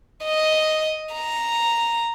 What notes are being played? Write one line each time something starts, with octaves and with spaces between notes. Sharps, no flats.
D#5
A#5